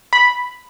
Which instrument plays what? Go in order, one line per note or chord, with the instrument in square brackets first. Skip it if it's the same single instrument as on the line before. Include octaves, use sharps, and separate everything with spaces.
[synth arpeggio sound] B5